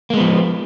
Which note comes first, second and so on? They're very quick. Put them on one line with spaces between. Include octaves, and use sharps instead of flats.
A#3 G#3 B3 F3